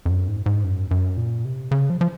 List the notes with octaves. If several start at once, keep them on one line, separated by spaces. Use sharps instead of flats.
F2
F#2
G#2
G#2
F#2
F#2
A#2
C3
C#3
F3
F3